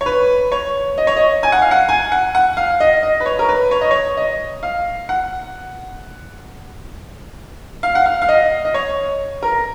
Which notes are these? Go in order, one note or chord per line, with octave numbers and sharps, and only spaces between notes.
C#5
B4
C#5
D#5
C#5
D#5
G#5
F#5
F5
F#5
G#5
F#5
F#5
F5
D#5
D#5
B4
C#5
A#4
B4
C#5
D#5
C#5
D#5
F5
F#5
F5
F#5
F5
F5
D#5
D#5
C#5
A#4